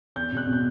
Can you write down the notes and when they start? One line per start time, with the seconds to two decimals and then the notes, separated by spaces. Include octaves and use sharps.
0.16 E2 G6
0.32 B2 F#6
0.47 B2
0.53 G6